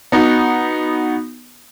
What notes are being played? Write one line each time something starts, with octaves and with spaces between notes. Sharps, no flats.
B3 D#4 F#4